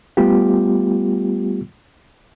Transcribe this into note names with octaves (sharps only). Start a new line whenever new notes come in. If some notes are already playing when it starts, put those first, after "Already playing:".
G3 A3 B3 F4 G4